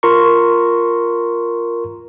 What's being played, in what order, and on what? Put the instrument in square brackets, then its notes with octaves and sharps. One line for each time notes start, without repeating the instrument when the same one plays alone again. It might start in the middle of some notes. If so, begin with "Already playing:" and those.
[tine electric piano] F4 A#4 A#5 C6 C#6